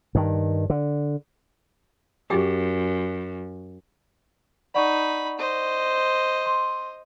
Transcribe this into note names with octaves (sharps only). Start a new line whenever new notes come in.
G2 D#3
D3
F#2 G4 G#4 G5
D#4 D5 F#5 B5 C#6
C5 D#5
C6